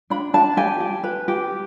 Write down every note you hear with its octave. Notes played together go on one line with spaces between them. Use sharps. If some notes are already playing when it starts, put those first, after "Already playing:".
D4 B5
D4 A5
G4 G#5
G4
B4
G4